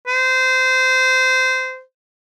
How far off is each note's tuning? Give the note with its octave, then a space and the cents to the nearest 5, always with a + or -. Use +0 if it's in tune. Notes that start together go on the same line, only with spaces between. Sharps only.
C5 -20